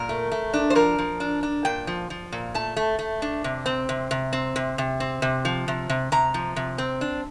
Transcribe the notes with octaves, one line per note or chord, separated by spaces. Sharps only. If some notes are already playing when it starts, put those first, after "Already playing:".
Already playing: A#2 A#4
A3
A3
D4
C5
F3 A#4
F3
D4
D4
A#2 G5
F3
F3
A#2
A3 A5
A3
A3
D4
C3
C4
C3
C3
C4
C3
C3
C4
C3
F3
C3
C3
C3 A#5
F3
C3
C4
D4